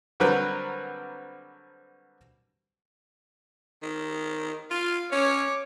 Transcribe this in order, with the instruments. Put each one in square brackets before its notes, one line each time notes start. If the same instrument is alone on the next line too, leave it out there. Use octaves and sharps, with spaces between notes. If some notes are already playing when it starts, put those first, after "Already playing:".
[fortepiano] D3 F#3 G3 C4 A#4 B4
[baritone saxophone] D#3
[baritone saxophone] F4 [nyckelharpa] F5
[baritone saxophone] C#4 [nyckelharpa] C#5 D6